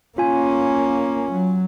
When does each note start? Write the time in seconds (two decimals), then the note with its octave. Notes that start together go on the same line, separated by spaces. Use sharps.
0.18 A#3 C#4 F4 G#5
1.32 F#3